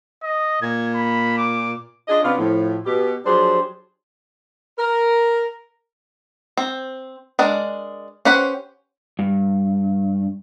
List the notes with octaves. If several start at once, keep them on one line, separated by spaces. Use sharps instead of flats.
D#5
A#2 G#6
B5
D6
D4 F4 G#4 D#5
C3 B3 C#4 D4 F4
A2 F3
B2 G4
F3 F#3 D4 G4 G#4 C5
A#4
C4
G#3 D4 A#4
C#4 G4 B4 C5 F#5
G2